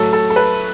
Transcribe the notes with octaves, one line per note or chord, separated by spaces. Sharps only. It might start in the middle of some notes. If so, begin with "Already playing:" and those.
Already playing: A2 F#3 A4
A4
A4
B4